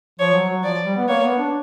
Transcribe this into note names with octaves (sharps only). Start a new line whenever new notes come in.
F3 C#5
F#3
F#3
F3 D5
G3
B3
A#3 C#5
B3
D4